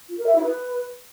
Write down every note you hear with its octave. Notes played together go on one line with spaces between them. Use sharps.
F4
A#4
E5
E4
B4